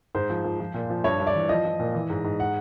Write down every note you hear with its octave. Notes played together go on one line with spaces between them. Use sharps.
G#2 C5
F3
F3
F3
A#2
F3
G2 C#5
G2
D5
E3
F3 D#5
F3
A#2
E3
G#2
G#2
F#5